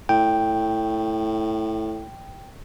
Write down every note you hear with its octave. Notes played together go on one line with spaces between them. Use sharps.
A2 G5